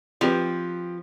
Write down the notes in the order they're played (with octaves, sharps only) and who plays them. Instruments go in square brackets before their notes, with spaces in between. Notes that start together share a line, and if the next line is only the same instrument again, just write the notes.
[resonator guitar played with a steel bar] F3 [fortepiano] C4 G4 B4